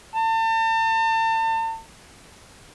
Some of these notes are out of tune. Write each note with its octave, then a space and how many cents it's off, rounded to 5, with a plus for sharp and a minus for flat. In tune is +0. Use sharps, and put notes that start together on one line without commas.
A5 +40